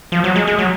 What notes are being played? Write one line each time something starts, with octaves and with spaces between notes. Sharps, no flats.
F3
F#3
G#3
G#3
F#3